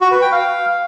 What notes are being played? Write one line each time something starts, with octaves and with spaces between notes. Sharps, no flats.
F#4
B4
G5
F5